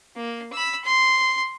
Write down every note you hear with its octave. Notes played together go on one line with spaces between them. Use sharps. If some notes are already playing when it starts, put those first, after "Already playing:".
A#3
B5 E6
C6